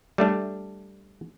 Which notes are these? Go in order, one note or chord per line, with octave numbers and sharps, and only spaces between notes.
G3 A3 D4